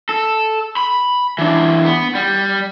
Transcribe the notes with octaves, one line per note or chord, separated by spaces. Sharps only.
A4
B5
E3 D4
B3
G3